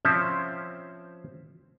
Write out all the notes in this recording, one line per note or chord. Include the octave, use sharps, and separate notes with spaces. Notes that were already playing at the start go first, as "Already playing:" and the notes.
F3 C4 C#4 C5 E5